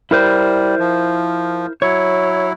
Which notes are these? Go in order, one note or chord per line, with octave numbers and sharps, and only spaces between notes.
G3 E4 A#4 C5
F3
F#3 E4 C#5